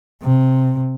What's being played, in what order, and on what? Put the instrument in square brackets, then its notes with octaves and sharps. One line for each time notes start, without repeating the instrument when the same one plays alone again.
[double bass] C3